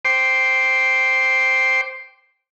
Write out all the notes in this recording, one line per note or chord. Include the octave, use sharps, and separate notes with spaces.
C5 G5 C6 D6